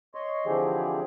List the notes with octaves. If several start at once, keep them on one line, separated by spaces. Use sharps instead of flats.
C#5 D#5 C6
D3 E3 F3 C4 G4 G#4